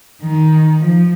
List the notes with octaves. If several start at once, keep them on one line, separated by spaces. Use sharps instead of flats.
D#3
F3